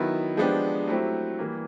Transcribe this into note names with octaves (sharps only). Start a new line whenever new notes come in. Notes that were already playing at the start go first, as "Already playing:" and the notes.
Already playing: D#3 F#3 B3 E4
F3 G#3 B3 D4 G4
F#3 A3 C4 E4 G4
E3 G3 A#3